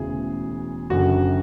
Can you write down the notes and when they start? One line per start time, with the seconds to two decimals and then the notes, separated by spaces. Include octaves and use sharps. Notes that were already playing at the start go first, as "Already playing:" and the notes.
Already playing: E1 D2 C#3 E3 G#4
0.90 F#1 F#2 D3 F#4